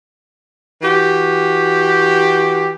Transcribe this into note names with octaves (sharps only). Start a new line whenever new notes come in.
E3 F#4 G4